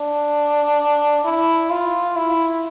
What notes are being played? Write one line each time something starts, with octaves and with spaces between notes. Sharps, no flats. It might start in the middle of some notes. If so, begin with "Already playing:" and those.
Already playing: D4
E4
F4
E4